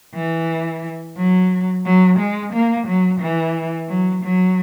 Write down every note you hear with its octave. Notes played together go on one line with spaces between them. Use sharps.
E3
F#3
F#3
G#3
A#3
F#3
E3
F#3
F#3